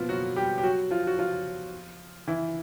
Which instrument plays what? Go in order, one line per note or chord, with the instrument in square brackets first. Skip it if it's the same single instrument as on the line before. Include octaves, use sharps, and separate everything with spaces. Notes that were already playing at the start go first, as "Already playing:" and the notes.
Already playing: [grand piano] B2 F3 A#3 B3 F4
F#3 F#4
G3 G4
G4
F#3 F#4
F3 F4
F#4
F3 F4
E3 E4